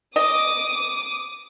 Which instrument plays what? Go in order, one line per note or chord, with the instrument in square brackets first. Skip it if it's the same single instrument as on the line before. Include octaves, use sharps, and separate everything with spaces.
[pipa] D#5 [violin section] D6 D#6